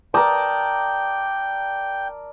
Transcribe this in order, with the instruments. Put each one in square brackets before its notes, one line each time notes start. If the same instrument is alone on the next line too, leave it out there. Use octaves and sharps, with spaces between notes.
[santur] A#4 D#6 [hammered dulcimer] D5 A5 [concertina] G5